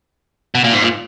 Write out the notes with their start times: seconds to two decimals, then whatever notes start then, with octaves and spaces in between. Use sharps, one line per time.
0.55 B2
0.64 A#2
0.73 G#2
0.82 A#2